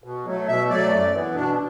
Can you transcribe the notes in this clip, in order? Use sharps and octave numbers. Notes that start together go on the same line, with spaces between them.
B2
F#3 A3
B2 E5
F#3 A3 D5
F#2
E3 B3
B2 D4